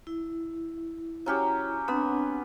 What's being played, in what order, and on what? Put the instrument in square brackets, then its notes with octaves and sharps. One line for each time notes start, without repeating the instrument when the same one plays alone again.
[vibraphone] E4
[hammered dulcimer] F#3 C#4 G4
[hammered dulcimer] B3 [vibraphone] C4 D4